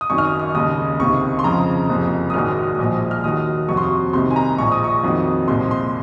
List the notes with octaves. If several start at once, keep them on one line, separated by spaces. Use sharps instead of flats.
D#6
G#1 F#2 D#3 C#6
F6
D#6
F6
D#2 C#3 G#3 D#6
C#2 C3 D#3 C#6
C6
F2 C#3 F3 G#3 A#5
F#1 F2 C3 F3
D#6
A#1 G#2 D#3 F#3 F6
A#1 A#2 F3 G#3
F6
D#2 D#3 F#3 D#6
F2 C3 F#3 C#6
C6
C#6
C2 C3 D#3 C6
G#5
A#5
A#1 A#2 F3 G#3 C#6
D#6
C#6
F2 D#3 F#3
C2 A#2 F3 G#3 C6
C6